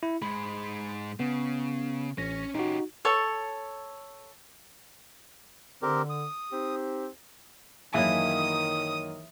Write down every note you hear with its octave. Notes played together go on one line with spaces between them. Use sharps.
E4
G#2 G#3 B5
C#3 B3
A1 C#4 A#6
C#4 D#4 F#4 G4
A4 C#5 A5
D3 C4 G4 A#4
D#6
C4 D#4 G4
F#2 D#3 E3 A#3 E4 G#4 D#6